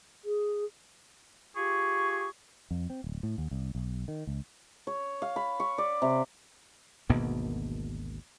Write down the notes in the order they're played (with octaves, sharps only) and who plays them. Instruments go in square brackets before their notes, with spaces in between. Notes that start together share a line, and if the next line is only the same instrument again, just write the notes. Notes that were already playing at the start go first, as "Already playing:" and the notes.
[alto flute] G#4
[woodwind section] F4 G4 G#4 C#6
[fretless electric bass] F2
C4
D1
A2
D#2
C2
B1
D#3
C#2
[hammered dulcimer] C#5
F5
B5
C#6
D5
C3
[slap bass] G#1 D2 B2 A#3